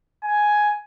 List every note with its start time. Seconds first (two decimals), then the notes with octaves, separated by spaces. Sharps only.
0.23 G#5